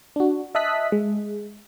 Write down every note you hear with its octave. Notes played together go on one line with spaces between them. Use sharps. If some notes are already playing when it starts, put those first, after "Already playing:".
D4 F#4
D#5 E5 A5 D#6 F#6 B6
G#3